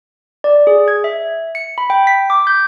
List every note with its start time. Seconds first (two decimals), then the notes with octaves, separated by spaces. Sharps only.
0.44 D5
0.67 G#4
0.88 G#6
1.04 E5
1.55 C#7
1.78 B5
1.90 G5
2.07 B6
2.30 D6
2.47 G6